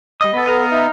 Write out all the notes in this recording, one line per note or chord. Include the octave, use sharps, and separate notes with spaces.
G3 D#5 D#6
B3 A4 B4
A4 B4 D#5 F5 A#5
D#4 E5